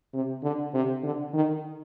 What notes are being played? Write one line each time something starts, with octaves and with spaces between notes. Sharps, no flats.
C3
D3
C3
D3
D#3